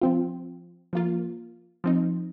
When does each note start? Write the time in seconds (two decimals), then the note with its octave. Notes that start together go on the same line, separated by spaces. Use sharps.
0.01 F3 C4 F4
0.93 F3 A#3 F4
1.84 F3 C4 D#4